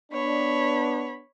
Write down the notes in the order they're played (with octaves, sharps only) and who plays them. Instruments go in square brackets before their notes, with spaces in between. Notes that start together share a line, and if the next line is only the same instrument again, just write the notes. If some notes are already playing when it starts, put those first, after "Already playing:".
[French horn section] B3 D4 [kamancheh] C#5 B5